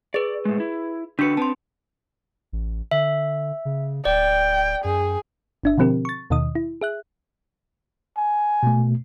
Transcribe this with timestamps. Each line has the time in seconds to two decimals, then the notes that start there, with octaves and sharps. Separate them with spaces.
0.14 G#4 B4 D5
0.45 A2 G#3
0.60 E4
1.19 D3 D4 F#4 B4 C#7
1.37 C4 B4 A5 C6
2.52 A1
2.91 D3 E5
3.65 C#3
4.05 D1 D5 G5
4.84 F#2 G#4
5.64 G1 D4 E5
5.78 B2 D3 F3 C4 G4 A#4
6.05 C#6 A6
6.30 D#2 B2 D#3 D#5 D#6
6.55 E4
6.81 G#4 E5 F#6
8.17 G#5
8.63 B2 A3